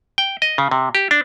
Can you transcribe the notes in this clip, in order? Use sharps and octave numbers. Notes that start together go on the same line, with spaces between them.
G5
D#5
C#3
C3
G4
D4